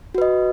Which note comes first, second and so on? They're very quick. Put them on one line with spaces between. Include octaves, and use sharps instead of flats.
F#4 B4 D#5